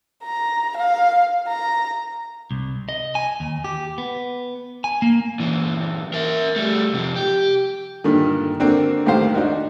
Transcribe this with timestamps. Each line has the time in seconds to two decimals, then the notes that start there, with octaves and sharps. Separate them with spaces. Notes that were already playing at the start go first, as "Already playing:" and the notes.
0.24 A#5
0.77 F5
1.48 A#5
2.51 C2
2.89 D#5
3.15 G#5
3.40 D#2
3.64 G4
3.98 B3
4.84 G#5
5.02 A#3
5.40 A#2 E3
6.14 A#4 E5
6.56 G3 A3
6.94 C3 F3
7.16 G4
8.04 G2 A#2 D3 D#3
8.60 D3 A#3 C4 D4 F#4
9.06 C2 A2 D#3 G4 C5 F5
9.35 D4 D#4 F#4